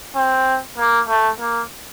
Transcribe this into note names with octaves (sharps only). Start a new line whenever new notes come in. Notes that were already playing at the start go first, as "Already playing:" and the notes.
C4
A#3
A3
A#3